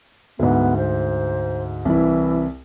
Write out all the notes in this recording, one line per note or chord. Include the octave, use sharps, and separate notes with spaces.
D2 G#2 B3
C5
C2 E3 E4